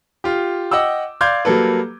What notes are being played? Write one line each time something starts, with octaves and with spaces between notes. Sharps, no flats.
F4 G4
D#5 F#5 G5 D6 E6
D5 F5 C6 D6 G6 G#6
F#3 G3 A#3 A4 B4